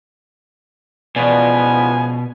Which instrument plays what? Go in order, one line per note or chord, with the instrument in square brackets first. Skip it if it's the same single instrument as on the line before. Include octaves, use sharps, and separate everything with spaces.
[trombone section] C#2 F3 B3 [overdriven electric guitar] B2 [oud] E3 F4 D5 [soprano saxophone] G#5